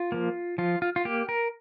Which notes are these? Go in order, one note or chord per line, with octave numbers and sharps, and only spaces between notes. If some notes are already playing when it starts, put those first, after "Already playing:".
Already playing: F4
F3 A#3
F3 F4
F4
F4
A#3 G4
A#4